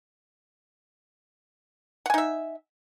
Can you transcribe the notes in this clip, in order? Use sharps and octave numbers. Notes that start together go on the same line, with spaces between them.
D#4 E5 F#5 G#5